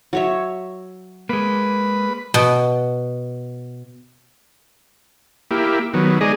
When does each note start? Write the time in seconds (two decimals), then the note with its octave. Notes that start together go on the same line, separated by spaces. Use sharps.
0.13 F#3 C#5 E5
1.29 G#3 A#3 B4
2.34 B2
5.51 A#3 E4 G4
5.94 D#3 F#3 B3
6.21 G#3 D#4 G#4 D5 D#5